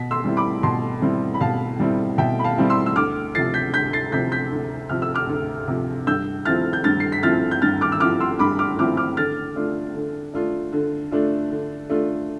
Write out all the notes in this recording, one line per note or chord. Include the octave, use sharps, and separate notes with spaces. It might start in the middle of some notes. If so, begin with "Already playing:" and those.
Already playing: B2 B6
C6 E6
G3 C4 E4
B5 D6
B2 A5 C6
G3 C4 E4
B5
B2 F5 A5
G3 C4 E4
B2 E5 G5
B5
F5 A5
G3 C4 E4
C6 E6
E6
D2 D6 F6
C3 F3 A6 C7
G6 B6
D2 G6 B6
A6 C7
C3 F3 G6 B6
G6 B6
D2
C3 F3 F6
E6
D6 F6
D2
C3 F3
G2 E6 G6
F3 C4 E4 F6 A6
G6
G2 F6 A6
C7
B6
F3 C4 E4 F6 A6
G6
G2 F6 A6
D6 F6
E6
F3 C4 E4 D6 F6
C6 E6
G2 B5 D6
D6 F6
F3 C4 E4 D6 F6
D6 F6
D3 F6 A6
A3 D4 F4
D3
A3 D4 F4
D3
A3 D4 F4
D3
A3 D4 F4